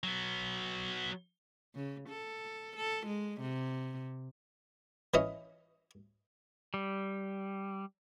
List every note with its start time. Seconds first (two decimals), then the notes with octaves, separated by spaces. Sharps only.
0.03 F#3 B3
1.75 C#3
2.09 A4
2.76 A4
3.06 G#3
3.41 C3
5.14 E3 C#4 D#5
6.74 G3